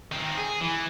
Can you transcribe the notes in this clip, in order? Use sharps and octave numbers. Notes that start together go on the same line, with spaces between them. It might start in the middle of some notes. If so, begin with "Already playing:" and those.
D#3 C4
G#4
E3